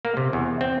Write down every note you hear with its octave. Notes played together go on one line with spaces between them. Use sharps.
A#3
C3
E2
C4